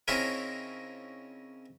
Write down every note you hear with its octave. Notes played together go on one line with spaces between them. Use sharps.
C#3 C4 C#4 D#4 E4 A#4